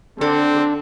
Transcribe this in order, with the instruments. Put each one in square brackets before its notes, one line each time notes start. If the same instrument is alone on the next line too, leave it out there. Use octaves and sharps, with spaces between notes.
[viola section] D3 [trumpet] C4 [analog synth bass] D4 [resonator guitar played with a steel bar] A4